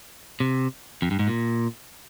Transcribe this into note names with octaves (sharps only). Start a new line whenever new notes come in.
C3
F2
G2
G#2
A#2